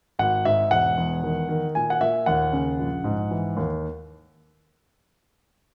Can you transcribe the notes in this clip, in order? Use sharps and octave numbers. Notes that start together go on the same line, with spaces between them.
G#1 F#5
G#2 E5
E1 F#5
E2
D#3
D#3
A#2 G#5
F#5
A#2 E5
D#2 F#5
C#3
A#1
G#2
E3
D#2